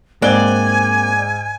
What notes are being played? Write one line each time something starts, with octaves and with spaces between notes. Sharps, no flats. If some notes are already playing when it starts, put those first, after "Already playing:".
G#2 A#3 C4 D5 G#5 F#6 G7